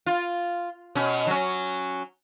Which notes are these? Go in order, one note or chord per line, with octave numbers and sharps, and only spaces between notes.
F4
B2 C#4
F#3 C#4